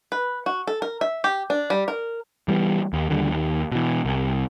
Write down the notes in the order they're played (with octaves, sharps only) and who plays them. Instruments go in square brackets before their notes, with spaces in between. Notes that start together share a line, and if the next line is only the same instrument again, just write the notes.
[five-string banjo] B4
F#4
A4
A#4
E5
G4
D4
G3
A#4
[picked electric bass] E3 G3 A3 B3
D#2
D#2 D3 F3 G3
D#2
B2 E3
C2